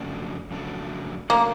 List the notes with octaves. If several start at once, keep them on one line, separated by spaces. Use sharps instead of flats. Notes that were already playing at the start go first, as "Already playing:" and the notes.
Already playing: F2 C#3 F#3 A3 D4
F2 C#3 F#3 A3 D4
C#3 F#3 A3 A#3 D4